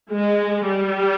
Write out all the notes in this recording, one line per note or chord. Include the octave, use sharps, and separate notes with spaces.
G#3
G3